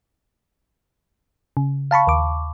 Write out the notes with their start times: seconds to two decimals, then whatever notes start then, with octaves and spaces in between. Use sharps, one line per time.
1.57 C#3
1.91 F5 A5 B5 C#6
2.07 D#2 D6